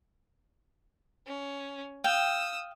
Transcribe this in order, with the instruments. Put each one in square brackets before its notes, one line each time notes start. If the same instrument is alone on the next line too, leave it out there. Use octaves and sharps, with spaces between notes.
[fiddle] C#4
[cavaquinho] F5 G5 [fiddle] D#6 E6